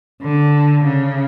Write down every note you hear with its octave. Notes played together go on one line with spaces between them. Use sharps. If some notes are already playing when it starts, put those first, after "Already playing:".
D3
C#3